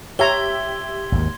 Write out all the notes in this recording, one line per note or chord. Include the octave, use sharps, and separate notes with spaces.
G4 C#5 E5 A#5 C6 G#6 G7
G#1 D#2 A#3